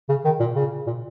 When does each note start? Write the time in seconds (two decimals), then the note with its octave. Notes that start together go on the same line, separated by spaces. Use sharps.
0.09 C#3
0.25 D#3
0.40 A#2
0.55 C#3
0.87 A#2